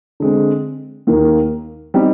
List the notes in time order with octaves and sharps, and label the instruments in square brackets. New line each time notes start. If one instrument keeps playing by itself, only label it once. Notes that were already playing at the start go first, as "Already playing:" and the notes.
[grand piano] D3 G#3 C4
D#2 D#3 A#3
G3 C4 D#4 G4